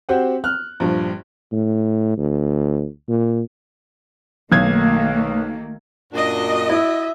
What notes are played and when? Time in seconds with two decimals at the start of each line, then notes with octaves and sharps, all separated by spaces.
0.09 C4 F#4 G4 C5 F#5
0.44 F6 F#6
0.80 A#1 G2 F3
1.52 A2
2.18 D2
3.09 A#2
4.52 B1 D#3 A3 A#3 G#6
6.12 F#2 A#2 D4 F#4 D#5
6.70 E4 E5